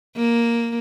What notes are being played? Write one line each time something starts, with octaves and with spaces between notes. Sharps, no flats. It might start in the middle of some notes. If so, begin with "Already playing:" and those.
A#3